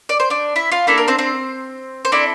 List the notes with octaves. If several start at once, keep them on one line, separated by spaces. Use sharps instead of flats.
D5
C5
D4 D5
E4 E5
F4 F5
A#3 D4 E4 A4 E5
A#4
C4 C5
C4 C5
C5
C4 D4 E4 A4 D5